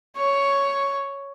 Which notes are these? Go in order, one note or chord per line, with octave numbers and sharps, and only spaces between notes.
C#5